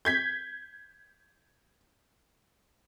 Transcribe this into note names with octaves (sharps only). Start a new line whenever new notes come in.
G6 G#6 B6